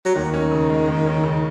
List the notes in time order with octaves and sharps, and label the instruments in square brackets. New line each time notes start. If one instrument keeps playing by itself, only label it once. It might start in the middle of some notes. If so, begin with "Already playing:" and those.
[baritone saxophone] F#3
[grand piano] D#2 [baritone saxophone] D#3
[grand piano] C#4
C#3
G#3
D#2
C#4
C#3